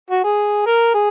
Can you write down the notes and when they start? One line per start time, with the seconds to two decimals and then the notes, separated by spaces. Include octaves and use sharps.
0.11 F#4
0.24 G#4
0.66 A#4
0.94 G#4